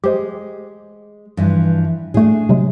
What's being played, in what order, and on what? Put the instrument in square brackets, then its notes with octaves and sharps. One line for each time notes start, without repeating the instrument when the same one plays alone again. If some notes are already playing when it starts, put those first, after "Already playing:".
[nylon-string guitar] G#3 [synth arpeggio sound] G4 C5 D#5
[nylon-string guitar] G2 E3 F3
[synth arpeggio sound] A2 A3 [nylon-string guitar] D4 G#4
[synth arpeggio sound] C3 F#3 G#3